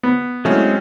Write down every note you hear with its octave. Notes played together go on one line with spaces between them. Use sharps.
B3
F#3 G#3 A3 C4 C#4 E4